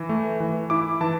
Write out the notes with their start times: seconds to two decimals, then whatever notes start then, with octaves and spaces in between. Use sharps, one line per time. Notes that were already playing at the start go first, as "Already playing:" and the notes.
Already playing: E3
0.09 A3
0.40 E3
0.70 E4 D6
1.01 E3 A5